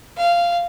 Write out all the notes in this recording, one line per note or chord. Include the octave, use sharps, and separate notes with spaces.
F5